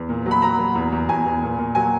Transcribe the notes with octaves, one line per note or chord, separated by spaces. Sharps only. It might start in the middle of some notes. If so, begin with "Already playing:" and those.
Already playing: E2
A#2
F#3
B5
F#3 A#5
F#3
E2
E2
E2 G#5
E2
A#2
A#2
F#3 G#5